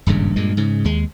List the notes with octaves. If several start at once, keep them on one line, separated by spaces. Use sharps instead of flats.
D#1 G#1 G2 C#3
G2 A#2 G#3
G#2 C#3
D#2 G#3